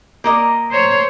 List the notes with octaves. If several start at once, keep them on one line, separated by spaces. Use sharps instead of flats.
A#3 A#4 D#5
C5 C#5